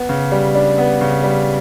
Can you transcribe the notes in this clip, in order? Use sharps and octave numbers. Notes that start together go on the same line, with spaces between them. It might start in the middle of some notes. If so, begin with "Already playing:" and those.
Already playing: B3
C#3
G3
D4
B3
C#3
G3